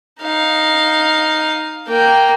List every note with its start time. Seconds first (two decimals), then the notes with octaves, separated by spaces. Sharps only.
0.21 D#4 F5
1.88 A#3 G5